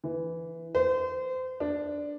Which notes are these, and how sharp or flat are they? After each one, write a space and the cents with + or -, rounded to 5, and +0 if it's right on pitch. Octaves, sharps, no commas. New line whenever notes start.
E3 +5
C5 -30
D4 +0